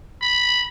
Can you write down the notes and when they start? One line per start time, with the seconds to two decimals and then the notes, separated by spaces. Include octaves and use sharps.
0.22 B5